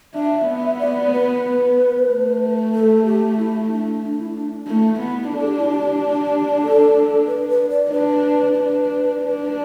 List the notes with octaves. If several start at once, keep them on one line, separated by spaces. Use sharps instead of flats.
D4 E5
B3
D5
B4
A3
A4
G4
E4
D4
D4
E4
E4
D4
D4
A3 E4
B3
D4 A4
G4
E4
G4
G4
A4
B4
B4
D5
D4 B4
D4
D4